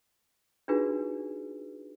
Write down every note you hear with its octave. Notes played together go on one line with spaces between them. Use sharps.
D4 D#4 F4 F#4 G#4 B4